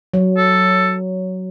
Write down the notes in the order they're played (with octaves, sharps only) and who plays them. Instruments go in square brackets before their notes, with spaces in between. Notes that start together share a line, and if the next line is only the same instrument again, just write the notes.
[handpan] F#3
[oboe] A4